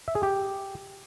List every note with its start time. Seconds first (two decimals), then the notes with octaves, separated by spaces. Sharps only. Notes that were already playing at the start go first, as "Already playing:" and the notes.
0.08 E5
0.15 G#4
0.23 G4